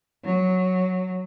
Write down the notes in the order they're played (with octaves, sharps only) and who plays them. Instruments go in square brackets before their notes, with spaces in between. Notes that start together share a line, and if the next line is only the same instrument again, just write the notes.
[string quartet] F#3